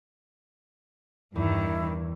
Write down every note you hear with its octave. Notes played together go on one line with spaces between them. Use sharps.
E2 G2 D#3 E4